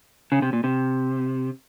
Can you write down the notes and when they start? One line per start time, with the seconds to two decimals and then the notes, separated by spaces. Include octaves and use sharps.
0.32 C#3
0.42 C3
0.53 A#2
0.64 C3